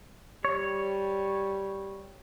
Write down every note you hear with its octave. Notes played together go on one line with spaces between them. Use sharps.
G3 C#5